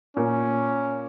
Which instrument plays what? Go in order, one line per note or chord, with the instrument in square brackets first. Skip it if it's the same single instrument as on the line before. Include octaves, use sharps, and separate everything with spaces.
[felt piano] A#2 [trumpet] C#4